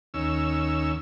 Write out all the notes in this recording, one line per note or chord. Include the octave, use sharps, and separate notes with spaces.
D#2 C#4 E6